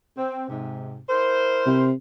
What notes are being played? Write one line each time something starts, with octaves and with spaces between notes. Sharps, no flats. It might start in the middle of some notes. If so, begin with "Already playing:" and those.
C4
G#2 C3
E4 A#4 C5
C3